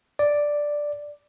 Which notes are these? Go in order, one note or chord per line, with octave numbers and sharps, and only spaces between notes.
D5